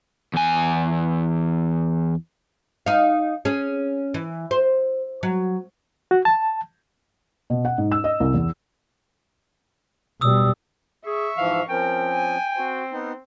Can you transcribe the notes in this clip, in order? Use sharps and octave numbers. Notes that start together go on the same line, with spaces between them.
E2 G#5
D#4 F5
C#4 G#4
E3
C5
F#3
F#4
A5
B2
F#5
G#2
E6
D#5
C2
E2
B2 G3 D#6 E6
G#4 E5 C#6
G#2 E3 F3 F5
F3 C4 C#4 A#4 G5
G#5
C4 F#4
B3 D#4